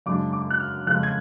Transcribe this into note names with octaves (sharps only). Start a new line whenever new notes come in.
F#2 C#3 G#3 D4 D6
D6
F#6
F6
F2 C#3 G#3 F#6
G#6